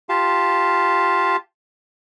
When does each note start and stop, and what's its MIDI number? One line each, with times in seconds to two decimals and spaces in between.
0.09 1.36 65
0.09 1.36 67
0.09 1.36 77
0.09 1.36 81